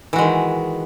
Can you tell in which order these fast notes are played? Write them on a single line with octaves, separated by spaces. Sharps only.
E3 F#4 G#3 D#3